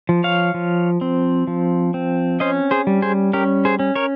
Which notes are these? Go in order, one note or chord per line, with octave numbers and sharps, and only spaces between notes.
F3
C#5 F5
F3
C4
F3
C4
C#4 C5 D#5
G#4 C5
G3
G#4 C5
C#4 G4 A#4
G#4 C5
C#4
A#4 C#5